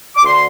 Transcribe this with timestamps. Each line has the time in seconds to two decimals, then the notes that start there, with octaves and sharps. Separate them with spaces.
0.16 D6
0.24 D2 D3 C6